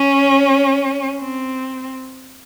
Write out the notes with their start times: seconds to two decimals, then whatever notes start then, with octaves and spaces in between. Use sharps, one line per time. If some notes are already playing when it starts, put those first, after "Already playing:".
Already playing: C#4
1.20 C4